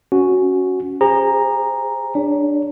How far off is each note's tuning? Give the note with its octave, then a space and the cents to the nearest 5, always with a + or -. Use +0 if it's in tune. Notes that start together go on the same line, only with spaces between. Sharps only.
C#4 +0 F#4 +0
G#4 -40 C5 +0 A#5 +0
D4 +10 C#5 +35